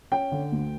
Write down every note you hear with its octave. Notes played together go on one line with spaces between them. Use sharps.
C#4 G5
D3
D2